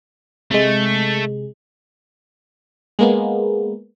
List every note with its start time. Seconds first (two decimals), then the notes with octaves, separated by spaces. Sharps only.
0.51 C3 G#3 A3
2.99 G#3 A#3 B3